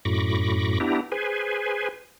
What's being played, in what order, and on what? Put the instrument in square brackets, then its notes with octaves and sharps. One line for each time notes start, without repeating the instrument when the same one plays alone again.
[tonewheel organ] F#2 A2 B5 C#6 D6 A#6
B3 D4 E4 G4 A#5
G#4 B4 C5 G#5